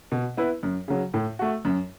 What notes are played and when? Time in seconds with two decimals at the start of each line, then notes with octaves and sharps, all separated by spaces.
0.12 B2
0.37 B3 E4 B4
0.63 F#2
0.88 C#3 F#3
1.14 A2
1.39 A3 F#4
1.65 F#2